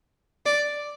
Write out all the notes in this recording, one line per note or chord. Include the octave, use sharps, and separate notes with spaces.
D5